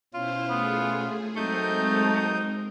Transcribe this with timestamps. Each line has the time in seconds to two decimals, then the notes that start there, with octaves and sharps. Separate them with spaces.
0.14 B2 C#4 E4 F4 C5
0.49 A3 B3 G#4
1.36 F#3 G#3 A3 C4 D#4 A#4 D#6 G6